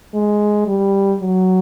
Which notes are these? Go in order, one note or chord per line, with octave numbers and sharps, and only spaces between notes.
G#3
G3
F#3